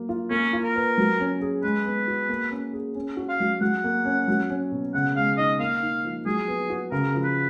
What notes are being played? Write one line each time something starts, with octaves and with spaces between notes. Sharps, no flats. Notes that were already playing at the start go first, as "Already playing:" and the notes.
Already playing: F#3 A#3
F4
A#3 C#4
F4
A#4
B4
F#3
C#4
G#4
G#3 B4
B3
F#4
A#3
C#4
G#4
C#4
F#4
F5
F#3
F#3 F#5
A#3
C#4
F#3
C#4
B2
C#3 F#5
G#3 F5
D#4 D#5
A#3 F5
D#4
F3
F#3 G#4
B3
F#4
C#3 A#4
F3
B4